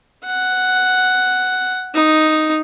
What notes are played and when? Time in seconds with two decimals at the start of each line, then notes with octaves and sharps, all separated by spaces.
0.25 F#5
1.94 D#4